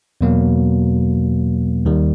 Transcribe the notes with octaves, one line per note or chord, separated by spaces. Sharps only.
E2 B2 F#3 A#3
D#2 D#3 G3